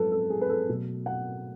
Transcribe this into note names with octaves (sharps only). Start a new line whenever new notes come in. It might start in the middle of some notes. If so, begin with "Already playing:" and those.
Already playing: F#2 F3 G#3 A4 B4
A4
G#4
B4
A4
B2 F#3 A3
F#5